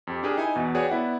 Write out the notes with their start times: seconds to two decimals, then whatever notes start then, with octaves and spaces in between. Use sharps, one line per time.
0.07 F2 G4
0.23 D4 G4 G#4 A#4
0.37 D#4 E4 G#5
0.56 E2 B2
0.75 F#4 G#4 B4 C#5 D5 G5
0.89 B3 E4 D5 F#5